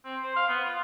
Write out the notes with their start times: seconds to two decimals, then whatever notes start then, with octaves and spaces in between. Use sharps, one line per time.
0.05 C4
0.22 C5
0.36 F5
0.48 B3
0.65 F4